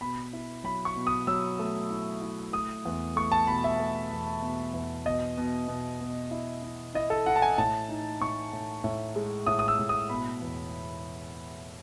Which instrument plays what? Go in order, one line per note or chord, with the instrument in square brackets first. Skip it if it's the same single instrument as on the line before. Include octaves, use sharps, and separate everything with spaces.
[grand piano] B2 B5
E4
F#3 B5
C#6
B2
D#6
F#3 E6
A3
E4
E4
A3 D#6
E2
A3 C#6
A5
B2 B5
E5
A3
E2
B2
E2
B2 D#5
B2
B2
B2
E4
E4
E4 D#5
A4
E4 F#5
A5
G#5
A2 A5
D#4
A2 C#6
A2
A2
G#3
A2 D#6
D#6
E6
A2
D#6
B2 B5
E2